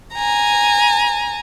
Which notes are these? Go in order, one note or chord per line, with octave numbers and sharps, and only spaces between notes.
G#5 A#5